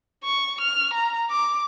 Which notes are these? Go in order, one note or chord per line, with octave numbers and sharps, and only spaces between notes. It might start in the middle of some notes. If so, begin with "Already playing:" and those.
C#6
F6
A#5
D6